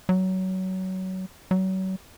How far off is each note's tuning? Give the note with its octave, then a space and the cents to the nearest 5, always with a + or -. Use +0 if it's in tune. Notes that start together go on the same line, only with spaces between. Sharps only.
F#3 +20
F#3 +35